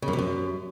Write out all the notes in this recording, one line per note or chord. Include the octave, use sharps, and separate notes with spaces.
C#3
F#2
C3
F#2